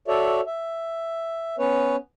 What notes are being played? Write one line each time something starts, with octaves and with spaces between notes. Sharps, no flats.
F#4 A4 C#5 D5 E5
E5
B3 C#4 B4 C#5